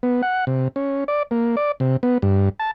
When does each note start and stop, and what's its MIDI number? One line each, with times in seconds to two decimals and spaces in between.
0.03 0.22 59
0.23 0.45 78
0.47 0.68 48
0.76 1.04 61
1.08 1.23 74
1.31 1.56 58
1.57 1.72 74
1.80 1.97 48
2.03 2.18 59
2.22 2.49 43
2.60 2.71 81